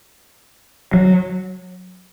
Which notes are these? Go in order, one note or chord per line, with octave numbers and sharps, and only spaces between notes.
F#3